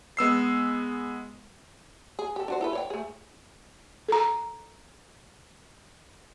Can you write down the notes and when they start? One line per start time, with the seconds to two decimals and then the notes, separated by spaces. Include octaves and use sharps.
0.17 G#3 B3 E6 C7
2.19 G#4
2.36 G4 A4
2.48 D4 F#4 C5
2.61 E4 A4 B4
2.73 C#5 D5 G5
2.90 A3 G#4
4.09 A4 A#5